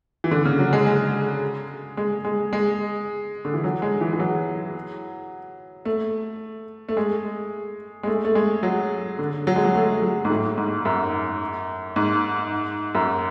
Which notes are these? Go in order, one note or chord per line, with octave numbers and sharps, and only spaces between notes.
E3
D3
C#3
F#3
G#3
G#3
G#3
G#3
G#3
D3
E3
F#3
G#3
E3
E3
F#3
A3
A3
G#3
G#3
A3
A3
G#3
F#3
D3
F#3
G#3
F#3
A3
F#3
G#2
A2
G#2
F#2
G#2
F#2